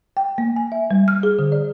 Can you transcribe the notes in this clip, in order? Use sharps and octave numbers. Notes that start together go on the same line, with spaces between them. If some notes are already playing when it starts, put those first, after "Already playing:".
G5
A#3
G#5
E5
G3
F6
G#4
D3
D5